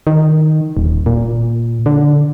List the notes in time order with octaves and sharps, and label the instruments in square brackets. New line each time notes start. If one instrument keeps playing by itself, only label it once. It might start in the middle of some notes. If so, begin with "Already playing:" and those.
[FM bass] D#3
D#1
A#2
D3